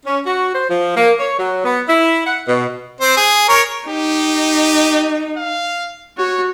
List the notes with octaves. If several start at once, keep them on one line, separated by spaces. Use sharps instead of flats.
C#4
F#4
C5
F3
A#3
C#5
F#3
B3
E4
F#5
B2
C4 C5
G#4
A#4 C#5
D#4 G4
F5
F#4 C#5